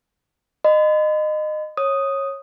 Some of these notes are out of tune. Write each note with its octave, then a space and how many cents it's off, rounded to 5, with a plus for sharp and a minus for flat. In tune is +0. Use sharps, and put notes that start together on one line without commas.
D#5 -20 B5 +45
C#5 -15 D#6 +0